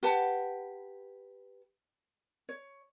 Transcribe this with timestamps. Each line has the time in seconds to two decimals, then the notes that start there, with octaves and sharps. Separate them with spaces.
0.03 G4 B4 F#5 A5
2.49 C#5